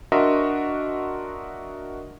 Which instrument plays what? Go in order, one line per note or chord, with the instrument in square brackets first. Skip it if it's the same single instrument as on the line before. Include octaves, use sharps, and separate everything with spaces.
[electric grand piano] D4 F#4 A#4 D#5 E5 C6